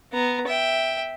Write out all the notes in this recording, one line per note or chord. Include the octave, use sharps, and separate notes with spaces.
B3 A#5
E5 G5